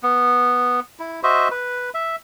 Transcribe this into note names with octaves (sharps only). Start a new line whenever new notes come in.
B3
E4
F#4 C5 D#5 E5
B4
E5